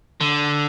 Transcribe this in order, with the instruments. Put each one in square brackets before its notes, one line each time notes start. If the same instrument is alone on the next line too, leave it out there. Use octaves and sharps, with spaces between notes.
[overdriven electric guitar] D3